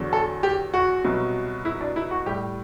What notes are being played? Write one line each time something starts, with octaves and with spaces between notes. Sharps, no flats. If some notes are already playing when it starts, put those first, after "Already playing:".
Already playing: E2 D3 F#3
A4
G4
F#4
C2 B2 F#3
E4
D4
E4
F#4
A2 G3 G4